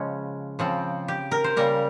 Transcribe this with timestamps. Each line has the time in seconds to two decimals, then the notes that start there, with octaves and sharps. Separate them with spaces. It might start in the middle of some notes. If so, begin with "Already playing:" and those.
Already playing: C#3 F3 G#3 C#4
0.59 C#3 F3 C4
1.08 G4
1.31 A#4
1.44 C5
1.56 C#3 G3 A#3 A#4